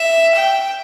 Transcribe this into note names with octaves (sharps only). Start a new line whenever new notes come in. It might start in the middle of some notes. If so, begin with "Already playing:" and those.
Already playing: E5
G5